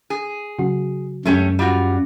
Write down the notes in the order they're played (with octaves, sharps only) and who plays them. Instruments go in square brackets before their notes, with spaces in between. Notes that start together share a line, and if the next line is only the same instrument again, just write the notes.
[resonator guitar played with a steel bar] G#4
[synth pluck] C#3 F#3 F#4
[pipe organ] F#2 [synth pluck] F#3 G#3 [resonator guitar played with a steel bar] A3 C#4 G4
[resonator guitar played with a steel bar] G3 F4 F#4